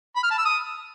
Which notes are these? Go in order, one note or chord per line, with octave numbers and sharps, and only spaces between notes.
B5
F6
A5
E6
D#6